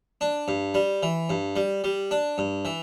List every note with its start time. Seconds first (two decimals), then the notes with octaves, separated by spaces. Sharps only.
0.21 D4
0.48 G2
0.74 G3
1.03 E3
1.29 G2
1.56 G3
1.84 G3
2.11 D4
2.38 G2
2.65 E3